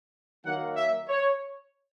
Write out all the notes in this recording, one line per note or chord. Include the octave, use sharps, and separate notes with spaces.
D#3 F#3 A#3 F#5
E5
C#5